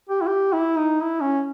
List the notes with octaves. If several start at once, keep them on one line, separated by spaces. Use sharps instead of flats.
G4
E4
G4
E4
D#4
E4
C#4